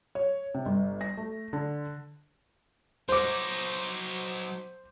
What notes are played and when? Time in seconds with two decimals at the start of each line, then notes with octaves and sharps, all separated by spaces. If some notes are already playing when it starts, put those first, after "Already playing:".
0.15 C#5
0.54 C3
0.66 G1
1.01 A#6
1.17 A3
1.53 D3
3.09 F#3 D#4 C5 D6